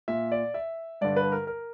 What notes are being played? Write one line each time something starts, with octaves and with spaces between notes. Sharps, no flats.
A#2 E5
D5
E5
G2 D3 D5
B4
A#4
A#4